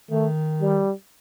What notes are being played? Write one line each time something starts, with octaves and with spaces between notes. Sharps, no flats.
D#3 A3
G3